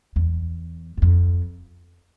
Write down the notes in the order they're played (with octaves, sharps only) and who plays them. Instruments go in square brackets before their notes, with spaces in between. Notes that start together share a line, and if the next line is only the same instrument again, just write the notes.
[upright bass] E2
F#2
F2